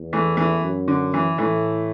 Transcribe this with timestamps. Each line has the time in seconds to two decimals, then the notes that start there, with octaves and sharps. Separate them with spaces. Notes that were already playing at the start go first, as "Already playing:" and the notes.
Already playing: E2
0.13 E3 A3
0.37 E3 A3
0.62 F#2
0.88 D3
1.14 E3
1.38 A2 E3 A3